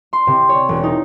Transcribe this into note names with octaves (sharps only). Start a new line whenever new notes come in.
C6
C3
C#5
E1
D#4